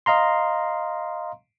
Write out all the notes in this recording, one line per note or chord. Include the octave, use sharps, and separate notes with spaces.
D#5 F5 A#5 C6